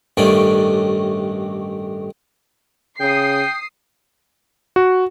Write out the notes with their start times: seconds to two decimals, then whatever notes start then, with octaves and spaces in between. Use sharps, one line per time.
0.17 A1 G2 D#3 A3 D4 C#5
3.00 C#3 G5 D#6 C7
4.76 F#4